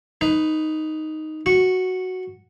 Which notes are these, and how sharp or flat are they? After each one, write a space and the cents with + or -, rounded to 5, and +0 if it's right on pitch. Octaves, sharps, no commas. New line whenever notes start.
D#4 +0 B4 +10
F#4 +0 C#6 -10